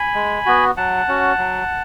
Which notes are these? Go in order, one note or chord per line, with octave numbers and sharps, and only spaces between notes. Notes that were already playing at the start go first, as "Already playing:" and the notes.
Already playing: G#5 B5
G#3
B3 F#4
F#3 F#5 A5
C#4 F#4
F#3